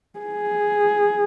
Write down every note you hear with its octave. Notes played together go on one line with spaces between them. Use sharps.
G#4